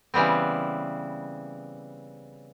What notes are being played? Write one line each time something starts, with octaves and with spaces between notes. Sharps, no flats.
C#3 E3 G3 B3 C4